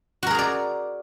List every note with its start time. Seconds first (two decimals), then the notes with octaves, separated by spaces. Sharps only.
0.23 F#4
0.27 A#4
0.31 G#4
0.35 A#5
0.39 D5